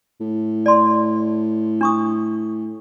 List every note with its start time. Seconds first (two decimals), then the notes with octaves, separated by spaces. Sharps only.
0.20 A2
0.66 D5 A5 C6
1.81 D4 C#6 D#6